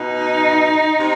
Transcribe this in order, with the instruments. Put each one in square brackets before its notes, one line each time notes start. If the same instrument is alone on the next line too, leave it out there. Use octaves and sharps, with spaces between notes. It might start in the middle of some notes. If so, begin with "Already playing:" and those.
Already playing: [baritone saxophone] B2 [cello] D#4
[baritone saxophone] C3